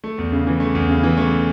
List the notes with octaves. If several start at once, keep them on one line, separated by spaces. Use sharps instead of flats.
A3
E2
C#3
E3
A3
E2
C#3
E3
A3